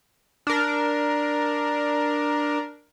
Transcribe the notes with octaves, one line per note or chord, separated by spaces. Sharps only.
D4 A#4